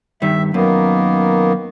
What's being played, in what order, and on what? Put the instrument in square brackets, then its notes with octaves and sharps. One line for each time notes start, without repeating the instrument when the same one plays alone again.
[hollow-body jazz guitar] G2 D#3 [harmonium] E5
[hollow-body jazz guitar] F#2 [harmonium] D#3 A#3 B3